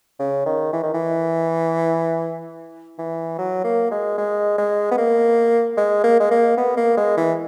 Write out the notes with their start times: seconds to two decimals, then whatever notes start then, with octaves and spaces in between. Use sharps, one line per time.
0.20 C#3
0.46 D#3
0.73 E3
0.83 D#3
0.94 E3
2.98 E3
3.39 F#3
3.64 A#3
3.91 G#3
4.18 G#3
4.58 G#3
4.91 B3
4.98 A#3
5.77 G#3
6.04 A#3
6.20 G#3
6.31 A#3
6.58 B3
6.77 A#3
6.97 G#3
7.17 E3